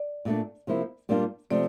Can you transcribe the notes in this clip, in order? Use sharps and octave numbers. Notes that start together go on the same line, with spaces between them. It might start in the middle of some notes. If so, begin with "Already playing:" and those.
Already playing: D5
A#2 A3 D4
C3 F3 A#3 E4
A#2 G3 A#3 D4 F4
C3 F3 A3 D5